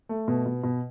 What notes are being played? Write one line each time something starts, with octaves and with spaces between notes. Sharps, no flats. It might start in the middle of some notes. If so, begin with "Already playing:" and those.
A3
B2
B2
B2